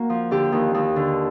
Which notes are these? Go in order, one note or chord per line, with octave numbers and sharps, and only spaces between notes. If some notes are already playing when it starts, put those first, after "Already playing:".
Already playing: A#3 F#4
F3
D3 G4
D#2
D#2
D3